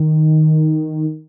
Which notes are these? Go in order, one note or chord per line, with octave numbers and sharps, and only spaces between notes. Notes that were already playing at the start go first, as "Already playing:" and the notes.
Already playing: D#3